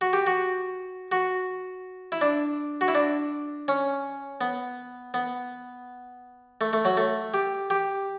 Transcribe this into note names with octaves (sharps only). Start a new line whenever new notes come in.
F#4
G4
F#4
F#4
E4
D4
F#4
E4
D4
C#4
B3
B3
A3
A3
F#3
A3
G4
G4